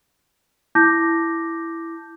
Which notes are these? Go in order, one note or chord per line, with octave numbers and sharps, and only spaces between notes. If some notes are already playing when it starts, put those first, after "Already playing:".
E4 A5 D6 G6 A#6